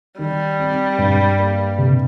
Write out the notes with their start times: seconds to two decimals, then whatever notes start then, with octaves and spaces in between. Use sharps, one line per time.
0.19 D#3 G3
0.59 C4
0.98 G2
1.39 A#3
1.78 C3